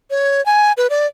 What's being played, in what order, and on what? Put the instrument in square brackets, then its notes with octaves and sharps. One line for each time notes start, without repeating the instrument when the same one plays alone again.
[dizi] C#5
G#5
B4
D5